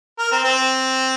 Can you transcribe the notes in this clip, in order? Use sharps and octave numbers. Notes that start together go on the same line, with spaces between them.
A#4
C4
C4